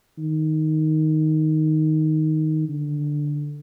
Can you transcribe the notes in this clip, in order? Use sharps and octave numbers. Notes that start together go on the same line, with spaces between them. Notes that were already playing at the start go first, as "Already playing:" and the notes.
D#3
D3